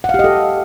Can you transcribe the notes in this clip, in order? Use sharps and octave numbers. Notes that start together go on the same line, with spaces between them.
F#5
F5
G4
D#5
A4